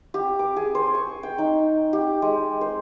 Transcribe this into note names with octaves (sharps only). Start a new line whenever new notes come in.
G4
D6
G#4
C5
C#6
G5
D#4
G4
G#3
C5